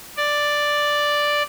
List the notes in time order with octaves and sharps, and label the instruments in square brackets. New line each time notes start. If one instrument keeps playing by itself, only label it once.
[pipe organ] D5